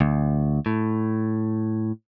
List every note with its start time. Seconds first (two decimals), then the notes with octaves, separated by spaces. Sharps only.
0.01 D2
0.66 A2